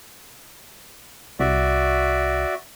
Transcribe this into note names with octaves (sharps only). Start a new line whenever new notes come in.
C2 F#4 D5 E5